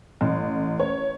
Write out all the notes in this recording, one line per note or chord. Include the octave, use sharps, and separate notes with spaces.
A1
C#5